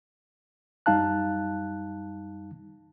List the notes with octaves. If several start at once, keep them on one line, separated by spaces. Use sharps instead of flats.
F#2 G3 D#4 F5 A5 F#6